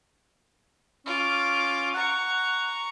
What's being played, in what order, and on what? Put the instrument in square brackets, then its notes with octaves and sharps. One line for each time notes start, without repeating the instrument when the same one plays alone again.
[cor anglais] C#4 [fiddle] F4 D6
[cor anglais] F#5 [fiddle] A#5 C#6